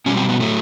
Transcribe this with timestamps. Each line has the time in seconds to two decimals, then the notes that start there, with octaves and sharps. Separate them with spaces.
0.06 B2 G3 C#4
0.17 C4
0.29 B3
0.40 A2 F#3 A3